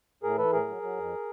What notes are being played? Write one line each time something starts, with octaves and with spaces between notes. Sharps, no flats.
A2 G#4 A#4
E3 A4 B4
A2 G#4 A#4
F#3
F#3
F2